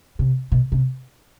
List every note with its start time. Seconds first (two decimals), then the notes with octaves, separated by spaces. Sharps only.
0.19 C3
0.52 B2
0.72 C3